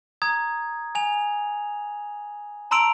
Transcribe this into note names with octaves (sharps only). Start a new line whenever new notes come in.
A#5 D#6 G#6
G#5 F7
A5 A#5 C6 E6 D7 F7